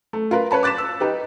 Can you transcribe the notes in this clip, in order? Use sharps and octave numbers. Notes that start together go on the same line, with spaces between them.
A3
F4 A#4 B4
B4 C#5 A5 B5
D6 F#6 A6 B6 E7
E6
D#4 G4 B4